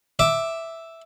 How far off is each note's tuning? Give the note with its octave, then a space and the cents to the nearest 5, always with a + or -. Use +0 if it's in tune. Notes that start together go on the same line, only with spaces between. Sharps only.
E5 +0 D6 +5